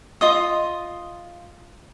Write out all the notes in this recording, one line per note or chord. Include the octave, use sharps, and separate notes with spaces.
F4 D#5 D#6